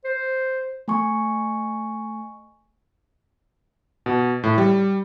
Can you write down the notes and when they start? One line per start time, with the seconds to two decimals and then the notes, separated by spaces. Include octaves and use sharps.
0.05 C5
0.88 A3 G#5 C#6
4.06 B2
4.43 A2
4.58 G3